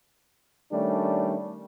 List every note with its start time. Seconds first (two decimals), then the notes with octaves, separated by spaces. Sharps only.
0.72 D#3 G3 A3 C#4 D4